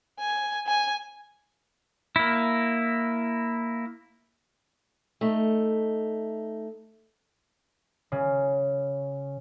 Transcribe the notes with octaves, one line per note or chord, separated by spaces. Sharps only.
G#5
G#5
A#3 E4
A3 D#4
C#3